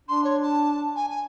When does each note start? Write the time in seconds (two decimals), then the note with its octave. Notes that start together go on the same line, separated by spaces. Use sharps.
0.09 D4 C6
0.25 C#5
0.42 A5
0.96 G#5
1.10 G#5